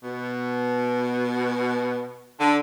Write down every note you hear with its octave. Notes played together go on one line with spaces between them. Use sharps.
B2
D3